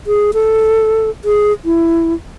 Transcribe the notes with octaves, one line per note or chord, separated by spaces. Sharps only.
G#4
A4
G#4
E4